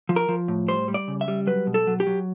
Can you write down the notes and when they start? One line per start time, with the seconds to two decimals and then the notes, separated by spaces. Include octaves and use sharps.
0.09 F3
0.16 A#4
0.29 F3
0.48 A2
0.68 G3 C5
0.88 G3
0.94 D5
1.08 C#3
1.21 E5
1.28 G3
1.47 F#3 B4
1.67 B2
1.74 A4
1.87 F#3
2.00 G4
2.07 F#3